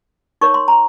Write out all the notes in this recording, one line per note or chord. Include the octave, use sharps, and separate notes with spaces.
D#4 A#4 C#5 C#6
C6
A#5